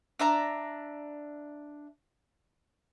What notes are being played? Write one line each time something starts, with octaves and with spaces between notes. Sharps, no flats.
D4 E5 A#5